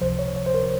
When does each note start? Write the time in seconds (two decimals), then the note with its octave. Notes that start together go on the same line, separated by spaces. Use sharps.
0.01 C#2 C3 F3 C5
0.19 C#5
0.36 C#5
0.47 C5
0.54 A#4